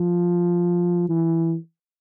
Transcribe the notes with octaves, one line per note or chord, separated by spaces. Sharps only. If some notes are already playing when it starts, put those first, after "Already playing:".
Already playing: F3
E3